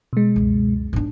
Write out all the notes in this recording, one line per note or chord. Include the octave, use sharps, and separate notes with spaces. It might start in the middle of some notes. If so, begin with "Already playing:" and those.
B2 G#3
C#2 F#2
G#2 D4